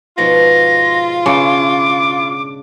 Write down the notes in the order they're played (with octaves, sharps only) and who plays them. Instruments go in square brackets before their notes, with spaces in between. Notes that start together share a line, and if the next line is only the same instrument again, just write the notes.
[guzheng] G#2 B2 F3 [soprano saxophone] F4 [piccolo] A#6
[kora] C#3 [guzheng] D4 E5 [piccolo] D6